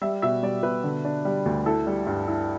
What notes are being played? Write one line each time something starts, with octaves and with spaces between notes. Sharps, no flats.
G3 E5
B2 E5
G3 D5
B2 B4
D3
D4
G3
D2
E4 A4
G3
G2
E4